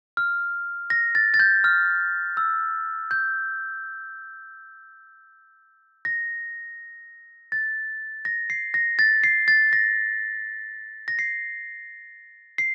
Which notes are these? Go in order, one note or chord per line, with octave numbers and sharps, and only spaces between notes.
F6
A#6
A6
A6
G6
F6
E6
G6
A#6
A6
A#6
C7
A#6
A6
C7
A6
A#6
A#6
C7
C7